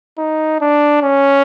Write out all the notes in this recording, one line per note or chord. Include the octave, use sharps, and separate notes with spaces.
D#4
D4
C#4